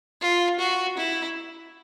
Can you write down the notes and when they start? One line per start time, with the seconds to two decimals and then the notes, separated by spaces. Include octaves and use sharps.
0.21 F4
0.59 F#4
0.97 E4